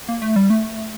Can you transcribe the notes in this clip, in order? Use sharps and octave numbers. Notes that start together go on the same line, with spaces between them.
A#3
A3
G3
A3